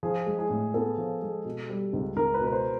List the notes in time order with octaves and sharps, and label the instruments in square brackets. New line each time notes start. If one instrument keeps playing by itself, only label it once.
[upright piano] F3 [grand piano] G#4
[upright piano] G#3
[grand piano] G#4
[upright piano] A2
[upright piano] B3 [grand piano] A4
[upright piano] F3
G#3
B2
G3
C#2
[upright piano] C#2 [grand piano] A#4
[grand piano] B4
[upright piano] B2
[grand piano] B4
C5